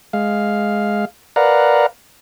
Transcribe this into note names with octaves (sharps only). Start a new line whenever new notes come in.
G#3 F5
A#4 B4 D5 F5 F#5 A#5